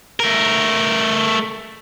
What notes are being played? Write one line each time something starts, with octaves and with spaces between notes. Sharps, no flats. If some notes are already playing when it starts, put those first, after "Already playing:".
A3 A#4